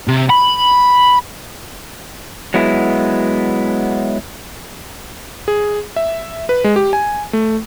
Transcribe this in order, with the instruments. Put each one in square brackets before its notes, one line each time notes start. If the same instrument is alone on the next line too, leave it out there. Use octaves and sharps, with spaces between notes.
[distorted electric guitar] C3
B5
[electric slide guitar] F#3 G#3 B3 E4
[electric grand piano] G#4
E5
B4
G#3
G4
G#5
A3